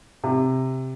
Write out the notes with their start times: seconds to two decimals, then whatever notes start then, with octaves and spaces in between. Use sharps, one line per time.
0.24 C3